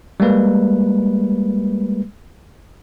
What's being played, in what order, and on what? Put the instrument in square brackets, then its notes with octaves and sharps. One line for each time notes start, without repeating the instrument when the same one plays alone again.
[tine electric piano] G3 G#3 A#3 B4